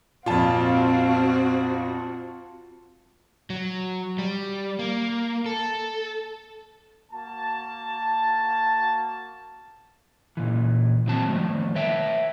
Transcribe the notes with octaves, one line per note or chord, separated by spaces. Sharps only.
F2 A#2 C4 F4 F#4 F5 A5
F#3
G3
A#3
A4
A#3 F#4 A5
A#2 E3
D#3 F#3 C4 A5
D#3 F3 A3
B4 C#5 E5 G5 A5